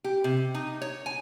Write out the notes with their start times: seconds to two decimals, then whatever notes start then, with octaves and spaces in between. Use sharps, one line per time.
0.04 G4
0.24 C3
0.54 D#4
0.82 C#5
1.06 G#5